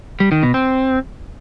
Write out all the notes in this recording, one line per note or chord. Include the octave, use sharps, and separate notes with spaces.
G3
D#3
B2
C4